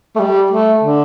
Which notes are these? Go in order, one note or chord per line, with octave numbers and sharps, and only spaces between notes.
A3
G3
A3
D3